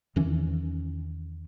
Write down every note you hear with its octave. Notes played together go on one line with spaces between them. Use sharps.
E2 D#3 E3 C#4